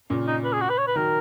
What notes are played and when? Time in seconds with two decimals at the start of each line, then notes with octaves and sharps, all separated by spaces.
0.10 A#2 C#3
0.27 D#4
0.44 B4
0.53 G#4
0.61 F#4
0.69 B4
0.78 C#5
0.87 B4
0.95 D#3 F#3 A#4